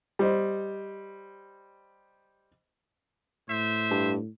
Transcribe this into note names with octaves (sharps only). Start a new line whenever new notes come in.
G3 C5 D#5
A2 C5 E5
G2